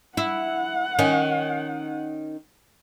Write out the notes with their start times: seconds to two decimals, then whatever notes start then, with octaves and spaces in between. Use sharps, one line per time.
0.17 E4 F#5
0.99 D#3 C#4